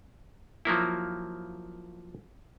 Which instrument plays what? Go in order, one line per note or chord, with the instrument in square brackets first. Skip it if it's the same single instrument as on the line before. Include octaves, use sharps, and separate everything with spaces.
[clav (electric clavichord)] F3 F#3 A#3 E4